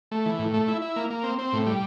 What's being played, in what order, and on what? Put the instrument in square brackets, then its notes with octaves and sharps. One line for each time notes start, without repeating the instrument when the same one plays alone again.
[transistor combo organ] A3
E3
A2
A3
E4
E4
A#3
A#3
C4
C4
A2
G3